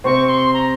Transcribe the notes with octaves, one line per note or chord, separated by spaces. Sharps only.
C3 C4 C#6
C6
A#5